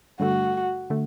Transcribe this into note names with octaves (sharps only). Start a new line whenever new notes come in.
G2 D3 A3 F#4
D3 A3